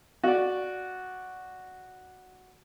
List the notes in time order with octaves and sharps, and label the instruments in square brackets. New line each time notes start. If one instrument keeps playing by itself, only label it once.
[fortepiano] F#4 D5